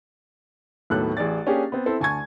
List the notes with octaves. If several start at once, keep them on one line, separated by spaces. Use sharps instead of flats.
D#2 A2 F#3 B3 A4 F#6
A1 G#4 D5 A6
A#3 C#4 D4 G4 G#4
B3 C4
C4 E4 A4
D2 G#5 A5 C#6 G#6